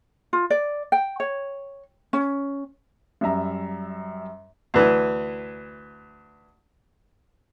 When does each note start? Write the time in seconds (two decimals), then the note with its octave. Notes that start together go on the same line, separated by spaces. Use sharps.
0.33 F4
0.50 D5
0.92 G5
1.20 C#5
2.13 C#4
3.21 F#2 G3 E5 A#5
4.74 D2 E3